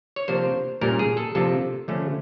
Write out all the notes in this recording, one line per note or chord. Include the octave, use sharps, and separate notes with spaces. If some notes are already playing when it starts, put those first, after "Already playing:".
C#5
C3 F3 A#3 D4 C5
A#2 G3 A#3 C#4 A#4
G#4
A4
C3 F3 A#3 D4 F4 A4
D3 F3 A3 C#4